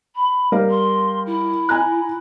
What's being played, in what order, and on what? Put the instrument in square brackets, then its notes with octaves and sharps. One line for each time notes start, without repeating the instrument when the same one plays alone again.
[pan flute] B5
[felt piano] G3 A#4 F5
[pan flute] C6
E4
[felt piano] G#5 A#5 F#6